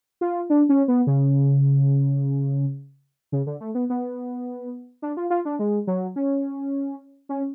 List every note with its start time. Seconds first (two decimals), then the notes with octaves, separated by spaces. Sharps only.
0.21 F4
0.50 D4
0.69 C#4
0.88 B3
1.07 C#3
3.32 C#3
3.47 D3
3.61 A3
3.75 B3
3.90 B3
5.02 D4
5.17 F4
5.30 F4
5.45 D4
5.59 G#3
5.87 F#3
6.16 C#4
7.29 C#4